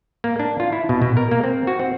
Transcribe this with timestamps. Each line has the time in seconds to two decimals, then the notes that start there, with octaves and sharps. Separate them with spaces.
0.24 A#3
0.40 D4
0.60 F4
0.73 E4
0.89 B2
1.02 B2
1.17 A#4
1.31 A#3
1.44 C4
1.67 F#4
1.80 C4